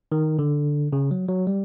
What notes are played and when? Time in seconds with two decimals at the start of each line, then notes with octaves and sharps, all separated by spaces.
0.12 D#3
0.39 D3
0.93 C#3
1.11 F#3
1.29 F#3
1.47 G3